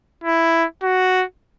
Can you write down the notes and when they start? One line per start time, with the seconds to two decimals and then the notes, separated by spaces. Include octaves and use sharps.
0.24 E4
0.83 F#4